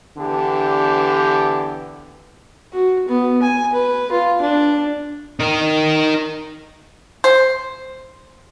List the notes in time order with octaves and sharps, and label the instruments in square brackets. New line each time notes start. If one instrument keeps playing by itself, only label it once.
[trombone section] D3 E3 B3 D4 G4
[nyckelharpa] F#4
B3
G#5
B4
F4
D4
[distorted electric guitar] D#4 A#4
[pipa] C5